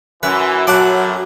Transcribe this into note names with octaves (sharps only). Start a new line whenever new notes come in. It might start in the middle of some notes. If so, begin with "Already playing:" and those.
F#2 E3 B4
A1 E2 A2 F#3 F#5 A5 D6